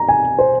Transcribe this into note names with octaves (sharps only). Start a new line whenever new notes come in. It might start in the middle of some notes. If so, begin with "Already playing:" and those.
Already playing: A#5
G#5
C5